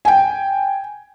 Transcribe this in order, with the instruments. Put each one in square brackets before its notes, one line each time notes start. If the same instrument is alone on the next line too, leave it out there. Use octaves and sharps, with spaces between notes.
[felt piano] G5 G#5